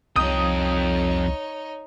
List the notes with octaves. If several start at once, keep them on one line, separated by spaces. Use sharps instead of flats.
C2 F2 D#4 C#5 G5 D#6